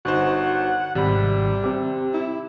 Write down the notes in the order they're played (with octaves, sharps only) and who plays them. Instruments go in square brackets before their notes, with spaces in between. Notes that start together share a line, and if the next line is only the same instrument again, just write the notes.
[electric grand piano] G1 D#4 C5 [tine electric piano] F#4 [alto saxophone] F#5
[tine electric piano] G#1 B5 [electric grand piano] C3 [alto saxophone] G3
[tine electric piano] C4 G4
[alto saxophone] E4